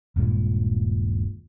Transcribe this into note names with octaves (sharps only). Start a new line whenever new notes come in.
D#1 G2 A#2 G#3